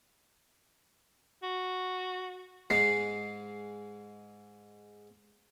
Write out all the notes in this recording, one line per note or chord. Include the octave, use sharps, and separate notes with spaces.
F#4
G#2 G#3 C7